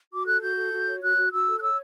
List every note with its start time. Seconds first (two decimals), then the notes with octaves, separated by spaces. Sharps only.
0.12 F#4 D6
0.27 A4 F#6
0.42 F#4 G6
0.57 A4
0.72 F#4
0.87 C#5
1.02 F#4 F#6
1.16 F#4
1.32 F#4 E6
1.47 A4
1.57 F#6
1.62 C#5 E6